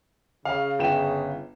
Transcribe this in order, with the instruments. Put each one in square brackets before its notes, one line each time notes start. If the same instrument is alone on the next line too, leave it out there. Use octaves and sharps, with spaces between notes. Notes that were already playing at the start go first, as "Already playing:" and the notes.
[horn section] C#3 [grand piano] F5
[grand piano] G1 G5 E7